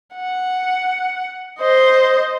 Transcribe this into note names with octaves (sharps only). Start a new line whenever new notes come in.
F#5
C5 D#5